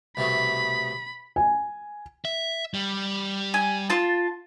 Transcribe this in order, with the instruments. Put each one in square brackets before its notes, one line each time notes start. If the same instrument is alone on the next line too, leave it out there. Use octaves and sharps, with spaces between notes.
[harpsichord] C2 B2 A3 [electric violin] B5
[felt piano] G#5
[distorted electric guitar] E5
G3
[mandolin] G#5
F4 A5